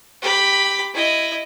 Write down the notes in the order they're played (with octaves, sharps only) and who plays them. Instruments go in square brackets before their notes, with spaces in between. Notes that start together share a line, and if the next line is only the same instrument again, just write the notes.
[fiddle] G4 B5
E4 D#5